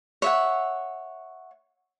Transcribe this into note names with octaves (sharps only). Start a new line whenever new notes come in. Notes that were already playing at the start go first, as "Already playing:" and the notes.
C#5 E5 F#5